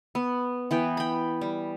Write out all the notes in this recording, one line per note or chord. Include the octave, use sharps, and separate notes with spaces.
B3
E3 B3 G5
G5 B5
G3